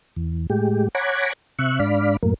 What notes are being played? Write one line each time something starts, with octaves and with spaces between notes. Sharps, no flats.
E2
A2 G#3 G4
C#5 F#5 G#5 A#5 B5 D6
C3 E5 C#6 F#6
G#2 D4 D5 F5 B5
F#2 A2 A#3